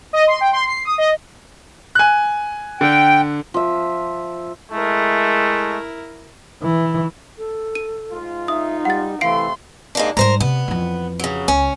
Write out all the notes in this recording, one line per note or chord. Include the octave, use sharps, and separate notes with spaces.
D#5
C6
G5
C6
C7
D#6
D#5
G#5 F#6
D3 G5
F3 E5
G#3 A3 E4 A#4
E3
A4
D#7
G#2 F4
D#4 E5 D#6
G3 F#5 A6
C3 E3 A3 F5 C6 C7 D7
G#2 A#3 D4
G#2 G3 A#4 C5 A#5
C3 B3
F2 E3
C#3 F#3
C#2 C#4